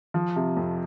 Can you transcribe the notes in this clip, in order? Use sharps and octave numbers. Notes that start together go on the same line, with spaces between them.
F3
C3
F2